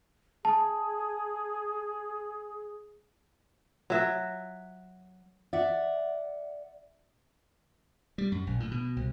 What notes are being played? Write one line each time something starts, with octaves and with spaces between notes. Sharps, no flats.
G#4 A5
F#3 E5
D5 E5 F#5
G3
F#2
A#1
A2
B2
C2